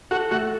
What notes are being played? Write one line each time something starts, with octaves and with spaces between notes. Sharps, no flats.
F#4 A4
A3 F#4